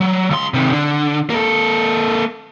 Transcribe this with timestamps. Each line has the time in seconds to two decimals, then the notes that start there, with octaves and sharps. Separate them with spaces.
0.01 F#3
0.30 C#2 C6
0.54 C3 D#3
0.72 D3
1.30 A#3 A4